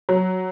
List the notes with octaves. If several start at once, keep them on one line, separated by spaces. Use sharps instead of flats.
F#3